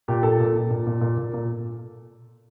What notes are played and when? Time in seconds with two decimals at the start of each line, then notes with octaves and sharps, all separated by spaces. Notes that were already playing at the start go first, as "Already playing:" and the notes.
0.08 A#2 G4
0.23 A#2 A4
0.40 A#2
0.47 A4
0.55 A#2
0.70 A#2
0.87 A#2
1.01 A#2
1.18 A#2
1.33 A#2